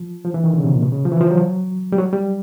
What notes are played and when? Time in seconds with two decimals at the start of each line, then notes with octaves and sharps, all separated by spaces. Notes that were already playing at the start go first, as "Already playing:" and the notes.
Already playing: F3
0.24 F3
0.34 E3
0.44 D#3
0.53 D3
0.58 C#3
0.64 C3
0.73 A#2
0.82 B2
0.93 C#3
1.05 F3
1.12 E3
1.20 F3
1.31 F#3
1.92 G3
1.98 F#3
2.13 G3